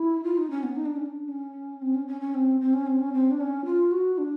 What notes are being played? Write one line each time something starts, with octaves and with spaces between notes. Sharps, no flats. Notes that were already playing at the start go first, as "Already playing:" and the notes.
Already playing: E4
F4
D#4
C#4
B3
D#4
D4
C#4
D4
C#4
C4
C#4
C#4
C#4
C4
C4
C#4
C4
C#4
C4
D4
C#4
F4
F#4
D4